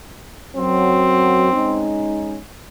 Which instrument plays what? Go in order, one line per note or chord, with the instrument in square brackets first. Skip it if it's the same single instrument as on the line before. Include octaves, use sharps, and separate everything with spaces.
[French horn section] F#2 F#3 [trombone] C4
[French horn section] G#3 C#4 D#4